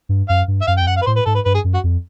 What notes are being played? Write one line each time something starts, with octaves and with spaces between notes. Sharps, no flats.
G2
F#2 F5
G2
E5
F#2 F5
G5
F2
F#2 F#5
F5
B4
A2 C5
B4
G#2 A4
B4
G2 B4
G#4
F#2
F#4
F2